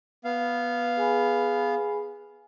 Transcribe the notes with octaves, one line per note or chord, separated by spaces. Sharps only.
B3 F5
G#4 G#5 B5